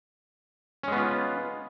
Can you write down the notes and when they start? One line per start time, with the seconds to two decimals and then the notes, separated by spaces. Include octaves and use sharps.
0.83 C#4
0.88 G#3
0.92 B3
0.97 F4